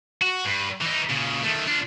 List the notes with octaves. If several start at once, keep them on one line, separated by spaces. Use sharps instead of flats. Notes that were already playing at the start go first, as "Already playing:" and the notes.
F#4
G2
E3 D#4
A#2 C#3
D#3 A3
D4 F4